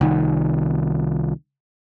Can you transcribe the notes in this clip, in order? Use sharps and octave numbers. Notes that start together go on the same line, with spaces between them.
C2 D#3